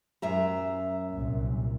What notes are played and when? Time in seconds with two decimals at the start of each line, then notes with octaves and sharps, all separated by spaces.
0.22 F#2 E5 A#5
1.11 C2 A#2